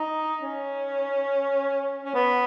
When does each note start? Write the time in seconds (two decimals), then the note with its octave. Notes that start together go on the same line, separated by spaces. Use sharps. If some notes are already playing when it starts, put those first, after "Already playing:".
Already playing: D#4
0.42 C#4
2.05 C#4
2.15 B3